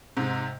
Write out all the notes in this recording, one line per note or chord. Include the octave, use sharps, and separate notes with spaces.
G#2 C3